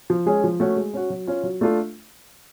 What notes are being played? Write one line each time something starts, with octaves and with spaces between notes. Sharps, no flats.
F3
G#3 C#4 G#4
F3
A3 C#4 F#4
G#3
C#4 F#4
F#3
C#4 F4
F#3
A3 D4 F4 A4